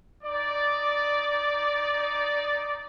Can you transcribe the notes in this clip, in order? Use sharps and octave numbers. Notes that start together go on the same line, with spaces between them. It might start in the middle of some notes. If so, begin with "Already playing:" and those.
D#4 D5